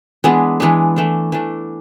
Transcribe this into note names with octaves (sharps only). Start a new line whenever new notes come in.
E3 G#3 B3 D4
E3 G#3 B3 D4
E3 A3 D4
E3 A3 D4